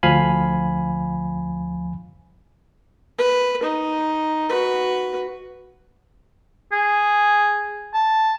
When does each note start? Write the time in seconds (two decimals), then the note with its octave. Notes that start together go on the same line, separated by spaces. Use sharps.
0.03 D2 F3 F5 G#5 B5
3.18 B4
3.63 D#4
4.50 F#4 B4
6.72 G#4
7.94 A5